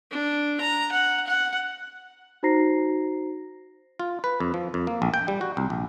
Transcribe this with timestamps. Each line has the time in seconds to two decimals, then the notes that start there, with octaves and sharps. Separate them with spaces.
0.11 D4
0.61 A#5
0.92 F#5
1.27 F#5
2.43 D#4 F#4 C5 A#5 A#6 C7
3.99 F4
4.24 B4
4.40 F2
4.54 F3
4.74 F2
4.87 A#3
5.02 A#1
5.14 G5
5.28 G3
5.41 F#4
5.57 C2
5.70 A#1